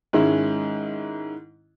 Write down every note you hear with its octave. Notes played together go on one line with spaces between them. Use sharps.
G#2 D#3 G#3 C#4 E4